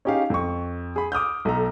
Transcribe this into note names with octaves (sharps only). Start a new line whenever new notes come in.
C#4 D#4 G4 G#4 F5
F2 C#6
G#4 B5
D6 D#6 F6 G6
B1 A4 A#5